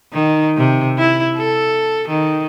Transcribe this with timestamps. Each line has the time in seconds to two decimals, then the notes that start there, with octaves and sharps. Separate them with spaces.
0.13 D#3
0.57 C3
0.98 E4
1.37 A4
2.08 D#3